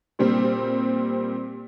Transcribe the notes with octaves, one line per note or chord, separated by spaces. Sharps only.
A#2 G3 C4